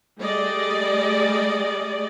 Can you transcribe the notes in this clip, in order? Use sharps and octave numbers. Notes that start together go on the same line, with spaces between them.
G3 A3 G#4 D5 D#5